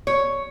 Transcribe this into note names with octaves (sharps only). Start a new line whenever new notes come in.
C#5